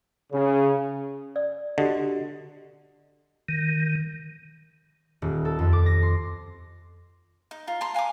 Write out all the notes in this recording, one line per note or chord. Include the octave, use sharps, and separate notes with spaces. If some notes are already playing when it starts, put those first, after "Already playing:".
C#3
D5
D3 F#4 G4 D#5
D#3
D#1
A4
F2
D6
A#6
C6
D#4
F4 A#5
A5 A#5 C6
F5 G#5 A#5 D6